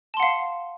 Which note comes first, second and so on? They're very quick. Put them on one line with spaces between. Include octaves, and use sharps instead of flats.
A5 C6 F#5 F5